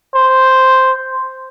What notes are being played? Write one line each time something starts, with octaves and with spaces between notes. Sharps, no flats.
C5